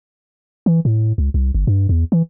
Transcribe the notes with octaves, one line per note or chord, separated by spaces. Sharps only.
E3
A2
C#2
C2
G1
G2
E2
E3